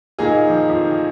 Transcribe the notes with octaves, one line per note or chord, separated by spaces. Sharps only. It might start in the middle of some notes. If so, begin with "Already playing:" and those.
A#2 D#3 A#3 D#4 G#4
F3
D#3
F2 F3
D#3